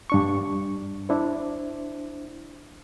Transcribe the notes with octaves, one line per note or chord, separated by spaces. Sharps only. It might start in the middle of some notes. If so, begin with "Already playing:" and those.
G2 D4 C#6
D4 E4 C5